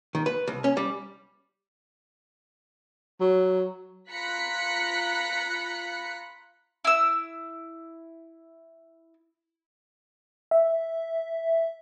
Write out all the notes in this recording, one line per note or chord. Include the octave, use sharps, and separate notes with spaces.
D#3
B4
C2
C#4
G3
F#3
F4 A#5 B5 F#6 B6 C#7
E4 E6
E5